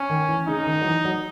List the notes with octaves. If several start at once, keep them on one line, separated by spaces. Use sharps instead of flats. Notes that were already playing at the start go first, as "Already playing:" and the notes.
Already playing: C#4
D#3
E3
C#3 D#4
D#3
F#3
E3
F#3